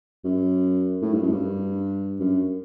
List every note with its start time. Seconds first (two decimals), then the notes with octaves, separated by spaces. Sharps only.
0.25 F#2
1.02 A2
1.13 G2
1.22 F#2
1.32 G2
2.20 F#2